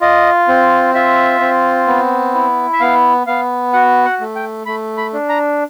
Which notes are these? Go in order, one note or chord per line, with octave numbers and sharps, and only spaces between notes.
F4 D#5
C4
F4 E5
C4
B3
E4
E5
B3 F5
B3 F5
F#4 F#5
F#5
A3
G5
A3 B5
B5
D4
A#5